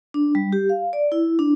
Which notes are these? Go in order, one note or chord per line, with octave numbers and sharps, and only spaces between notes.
D4
G3
G4
F5
D5
E4
D4